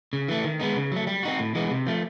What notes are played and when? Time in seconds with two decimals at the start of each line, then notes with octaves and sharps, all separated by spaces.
0.13 C#3
0.28 E3 A3
0.44 D#3
0.60 G#3 B3 D#4
0.76 C#3
0.92 F#3 A3
1.07 G3
1.23 C4 D#4 F#4
1.39 A2
1.55 E3 G#3 B3 D#4
1.71 C3
1.87 F3 A3